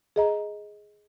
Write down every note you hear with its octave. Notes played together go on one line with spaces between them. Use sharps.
G#4 D#5 A#5